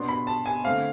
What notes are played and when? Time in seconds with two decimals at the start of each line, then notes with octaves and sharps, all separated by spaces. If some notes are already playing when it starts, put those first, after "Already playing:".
Already playing: B2 B3 D4 C6
0.09 B5
0.27 A5
0.46 G#5
0.64 D3 A3 C4 F5